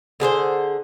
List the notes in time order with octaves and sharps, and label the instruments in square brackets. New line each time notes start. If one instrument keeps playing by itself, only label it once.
[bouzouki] D3 G#4 B4 C5